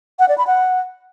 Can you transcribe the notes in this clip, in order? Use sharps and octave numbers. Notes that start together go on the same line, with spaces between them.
F#5
D5
B5
F#5